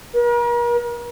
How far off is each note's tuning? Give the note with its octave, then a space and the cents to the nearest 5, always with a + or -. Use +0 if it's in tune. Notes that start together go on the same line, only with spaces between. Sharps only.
A#4 +40